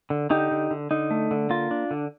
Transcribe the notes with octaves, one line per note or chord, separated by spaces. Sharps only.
D3
D3 D#4 G4
D3
D3
D3 D#4
A3
D3
A#3 F4
D4
D3